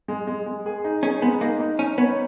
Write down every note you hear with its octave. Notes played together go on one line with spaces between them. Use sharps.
G#3
G#3
G#3
G#4
D#4
C#4 G#4
G#3 B3
A#3 D#4
D#4
C#4 D#4
B3 C#5